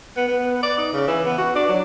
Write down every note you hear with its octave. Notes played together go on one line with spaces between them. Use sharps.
B3
B3
D5
D#4
C#3
E3
B3
F#4
D4
F#3